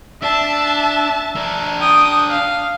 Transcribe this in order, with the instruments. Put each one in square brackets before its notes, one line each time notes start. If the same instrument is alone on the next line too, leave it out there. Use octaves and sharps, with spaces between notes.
[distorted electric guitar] D4 [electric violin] E5 A5
[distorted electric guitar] D4 A#4
[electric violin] G5 D#6
F5